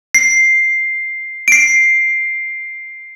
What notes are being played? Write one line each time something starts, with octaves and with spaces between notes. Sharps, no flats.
C7
D7
C7